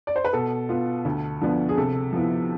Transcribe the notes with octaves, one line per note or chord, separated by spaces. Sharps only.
D5
C5
B4
B2 A4
B3 F4
D2
D3 F3 B3 D4
G#4
C3 A4
F3 B3 E4